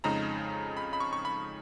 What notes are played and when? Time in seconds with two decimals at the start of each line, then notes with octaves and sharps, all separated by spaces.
0.04 F2 C#3 G#3 D#4 A#5
0.77 B5
0.93 B5
1.00 C#6
1.13 C#6
1.25 B5